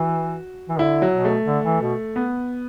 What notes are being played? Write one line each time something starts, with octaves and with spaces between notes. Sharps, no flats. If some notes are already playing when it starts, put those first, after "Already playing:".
Already playing: E3 F#4
E3
D3 E4
F#3
B2
A3
D3
E3
B2
B3